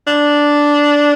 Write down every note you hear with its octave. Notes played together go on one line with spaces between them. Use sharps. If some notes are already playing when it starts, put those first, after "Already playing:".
D4